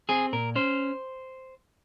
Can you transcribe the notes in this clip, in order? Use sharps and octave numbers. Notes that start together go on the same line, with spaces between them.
C4 G#4
A#2 A#4
C#4 C5